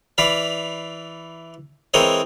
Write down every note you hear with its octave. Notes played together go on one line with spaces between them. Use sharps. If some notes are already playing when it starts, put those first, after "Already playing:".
E3 D5 F5 B5
E3 G#3 C4 A#4 C#5 D#5